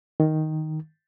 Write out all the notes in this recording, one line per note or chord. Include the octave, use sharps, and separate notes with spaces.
D#3